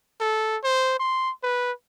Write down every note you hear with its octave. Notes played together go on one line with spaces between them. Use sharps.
A4
C5
C6
B4